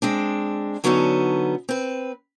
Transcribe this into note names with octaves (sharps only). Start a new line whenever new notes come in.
G#3 C4 D4
D3 F#3 B3 C#4 D#4 A4
C4 B4